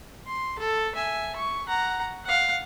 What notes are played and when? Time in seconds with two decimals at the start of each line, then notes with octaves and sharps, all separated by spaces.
0.26 C6
0.59 A4
0.95 E5 G#5
1.36 C#6
1.67 F#5 A#5
2.25 F5 F#5